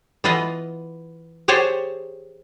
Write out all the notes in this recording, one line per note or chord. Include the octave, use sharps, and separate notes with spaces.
E3 B3 F4 B4 D#5
G4 G#4 C5 C#5 A5